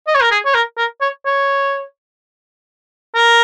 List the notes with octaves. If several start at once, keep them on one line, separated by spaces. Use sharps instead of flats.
D#5
C#5
A#4
G#4
C#5
A#4
A#4
C#5
C#5
A#4